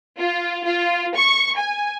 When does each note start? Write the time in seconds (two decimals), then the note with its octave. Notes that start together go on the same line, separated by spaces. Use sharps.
0.19 F4
0.65 F4
1.16 C#6
1.58 G#5